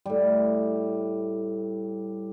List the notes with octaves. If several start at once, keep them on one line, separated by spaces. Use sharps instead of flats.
A2 G3